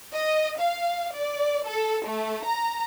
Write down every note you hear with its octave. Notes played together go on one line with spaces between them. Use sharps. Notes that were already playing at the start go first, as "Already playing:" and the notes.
D#5
F5
D5
A4
A3
A#5